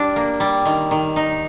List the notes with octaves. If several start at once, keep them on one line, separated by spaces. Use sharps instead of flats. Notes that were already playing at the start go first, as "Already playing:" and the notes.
Already playing: G3 D4
A#3
G3
D#3
D#3
D#4